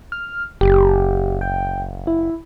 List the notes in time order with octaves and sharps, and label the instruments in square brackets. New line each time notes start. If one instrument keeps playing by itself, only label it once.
[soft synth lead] F6
[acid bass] F#1 [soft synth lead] G4
[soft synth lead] G5
E4